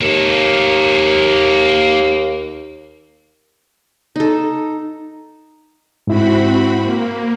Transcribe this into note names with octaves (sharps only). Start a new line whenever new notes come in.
D#2 A#3 A4
D#4 A4
G#2 C4 E4 F#4 B5
A#3